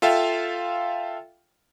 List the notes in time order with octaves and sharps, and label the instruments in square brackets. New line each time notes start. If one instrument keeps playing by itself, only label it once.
[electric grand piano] F4 A4 E5 F5 G5